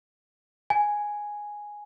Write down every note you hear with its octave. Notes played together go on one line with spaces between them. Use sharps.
G#5